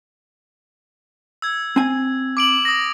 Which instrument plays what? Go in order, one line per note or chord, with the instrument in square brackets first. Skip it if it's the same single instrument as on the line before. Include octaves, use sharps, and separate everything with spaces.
[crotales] E6 G#6
[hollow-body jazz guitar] C4 G#5
[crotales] D6 D7 F#7
D#6 A#6